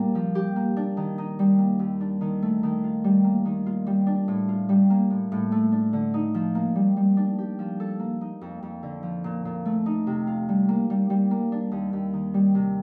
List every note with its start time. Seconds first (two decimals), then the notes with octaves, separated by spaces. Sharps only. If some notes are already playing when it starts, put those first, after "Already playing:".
Already playing: A#2 G3 A#3 D4
0.15 F3
0.35 G4
0.56 A#3
0.77 D4
0.97 D#3
1.18 D#4
1.39 G3
1.59 A#3
1.79 D#2
2.01 D4
2.21 D#3
2.42 A3
2.63 D#3
2.84 F4
3.04 G3
3.24 A#3
3.45 D#3
3.66 F4
3.87 G3
4.07 D4
4.28 A2
4.48 F4
4.69 G3
4.90 A#3
5.10 A2
5.32 A2
5.52 A3
5.72 D4
5.93 D3
6.14 D#4
6.34 F3
6.55 A#3
6.75 G3
6.97 G3
7.17 D4
7.38 G4
7.59 F3
7.80 A4
7.99 A#3
8.21 D#4
8.41 F2
8.63 F2
8.83 D3
9.03 F3
9.24 A#2
9.45 A#2
9.65 A3
9.86 D#4
10.07 C3
10.27 F4
10.49 G3
10.69 A#3
10.90 G3
11.10 G3
11.31 A#3
11.52 D4
11.71 D#2
11.93 D#2
12.13 D#3
12.34 G3
12.55 C3